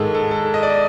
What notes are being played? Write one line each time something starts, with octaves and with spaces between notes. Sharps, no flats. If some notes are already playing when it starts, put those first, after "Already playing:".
Already playing: G#2 D#3 G#3 G#4 A4
A4
A4
D#5
D5
D#5